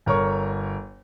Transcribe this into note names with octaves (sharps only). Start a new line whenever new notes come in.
G1 A#4 C#5 C#6